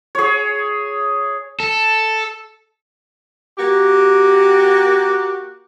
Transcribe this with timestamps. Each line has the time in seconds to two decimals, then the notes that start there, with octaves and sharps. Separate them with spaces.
0.15 G#4 C#5
1.60 A4
3.58 A#3 F#4 G4